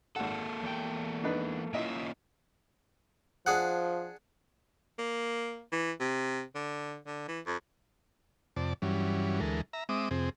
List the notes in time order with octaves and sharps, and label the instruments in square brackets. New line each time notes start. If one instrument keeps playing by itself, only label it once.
[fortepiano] G#1 F#5 [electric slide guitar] A#3 A4
[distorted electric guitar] E2 G5
[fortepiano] D4 D#4 B4
[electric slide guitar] A#3 C#4 F4 [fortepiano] E4 D#5 [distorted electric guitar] E5
[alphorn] F3 [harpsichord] D4 G#4 F#5
[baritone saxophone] A#3
E3
C3
D3
D3
E3
F2
[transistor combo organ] F2 C3 D5 A5
G2 E3 F#3 G3 C#4
D2 E3 G#3 A4 A#4
E5 A#5
G#3 C4 E5 D6 D#6
F2 C3 C4 G#4